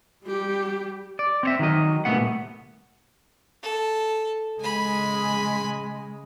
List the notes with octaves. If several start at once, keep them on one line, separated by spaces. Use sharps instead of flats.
G3 G4
D5
C4 C#5 E5
D#3 F#3 D#5
C2 F#2 A#2 A3 B3 F#5
A4
C#3 G#3 G#5 B5